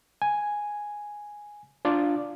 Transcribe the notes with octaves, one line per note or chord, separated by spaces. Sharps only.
G#5
D4 F4 D5